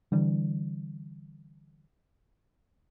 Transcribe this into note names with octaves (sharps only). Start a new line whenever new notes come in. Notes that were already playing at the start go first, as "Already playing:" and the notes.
D3 E3 G3